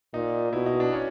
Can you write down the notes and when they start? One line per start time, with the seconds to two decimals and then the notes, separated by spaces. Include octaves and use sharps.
0.14 A#2 D#4
0.53 B2 E4
0.66 D#4
0.80 D4
0.93 C#4